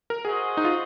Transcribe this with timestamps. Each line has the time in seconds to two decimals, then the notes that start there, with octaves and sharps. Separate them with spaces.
0.10 A#4
0.25 F#4 G#4 C5 D#5 F#5
0.57 D#4
0.65 F4